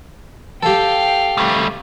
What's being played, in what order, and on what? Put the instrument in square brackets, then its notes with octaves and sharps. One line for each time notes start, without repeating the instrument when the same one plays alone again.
[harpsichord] G4 A4 [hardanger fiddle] F5 G5
[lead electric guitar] G3 A3